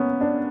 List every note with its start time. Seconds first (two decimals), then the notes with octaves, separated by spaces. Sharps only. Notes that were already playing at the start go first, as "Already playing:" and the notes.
Already playing: A#3 B3 C#4
0.21 D4